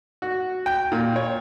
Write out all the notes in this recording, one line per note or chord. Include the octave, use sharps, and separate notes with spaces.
F#4
G5
A#2
C#5